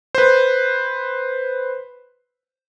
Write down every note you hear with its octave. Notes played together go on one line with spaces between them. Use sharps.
B4 C5